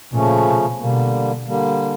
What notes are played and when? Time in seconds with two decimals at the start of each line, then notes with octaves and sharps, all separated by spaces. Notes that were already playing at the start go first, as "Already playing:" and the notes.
0.13 A#2 C#3 F3 A3 C#4
0.46 B2
0.79 B2 D3 G3 A#3
1.45 D3 G3 A#3